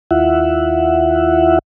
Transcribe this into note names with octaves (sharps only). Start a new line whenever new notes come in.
D#2 E4 F4 E5 F#5